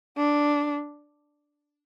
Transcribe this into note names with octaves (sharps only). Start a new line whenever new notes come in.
D4